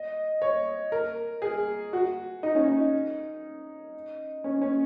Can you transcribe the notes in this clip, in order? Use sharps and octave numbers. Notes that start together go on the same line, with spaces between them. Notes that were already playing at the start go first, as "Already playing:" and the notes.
Already playing: D#5
C#5
A#4
G#4
F#4
D#4
C#4
D#4
C#4
C#4